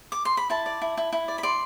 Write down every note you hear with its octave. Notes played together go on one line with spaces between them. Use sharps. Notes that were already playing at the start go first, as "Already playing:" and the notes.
D6
C6
B5
E4 A5
D5
E4
E4
E4
D5
B5
D5 C6